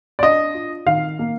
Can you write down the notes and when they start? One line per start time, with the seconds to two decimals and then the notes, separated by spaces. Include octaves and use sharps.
0.19 D5
0.23 D4 D#5
0.54 F4
0.86 D#3 F5
1.19 A#3